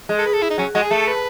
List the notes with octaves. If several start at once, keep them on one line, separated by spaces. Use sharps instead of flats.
G#3
A4
B4
A4
E4
D#4
F#3 C#4
G#3 F#4
G#4
A3 A4
B4